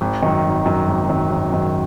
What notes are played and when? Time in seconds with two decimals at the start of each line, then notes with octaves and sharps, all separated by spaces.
0.01 G#1
0.22 F#2 D#3
0.44 G#1
0.65 F#2 D#3
0.88 G#1
1.09 F#2 D#3
1.30 G#1
1.52 F#2 D#3